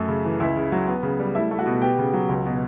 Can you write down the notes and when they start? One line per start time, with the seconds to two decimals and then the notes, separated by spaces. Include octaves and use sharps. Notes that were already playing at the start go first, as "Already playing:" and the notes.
Already playing: F#2 A3
0.08 C#3
0.25 E3
0.40 C#2 E4 E5
0.57 C#3
0.72 F#3
0.88 B3
1.03 C#3
1.20 G3
1.35 A3 E4 E5
1.51 A3
1.59 F#4 F#5
1.66 B2
1.82 B3 G4 G5
1.98 C#3
2.14 F#3
2.29 C#2
2.46 B2